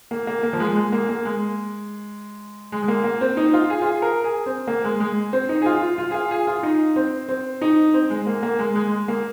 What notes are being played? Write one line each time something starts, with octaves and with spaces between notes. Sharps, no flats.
A#3
A#3
A#3
F3
G#3
G#3
A#3
A#3
G#3
G#3
G#3
A#3
A#3
C4
D#4
F4
G#4
F4
G#4
A#4
G#4
C4
A#3
G#3
G#3
C4
D#4
G#4
F4
F4
F4
G#4
F4
G#4
F4
D#4
C4
C4
D#4
C4
G#3
A#3
A#3
G#3
G#3
G#3
A#3